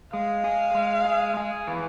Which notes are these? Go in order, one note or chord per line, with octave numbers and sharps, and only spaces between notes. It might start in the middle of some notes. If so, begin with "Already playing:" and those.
G#3 F5
G#4
G#3
G#4
G#4
E3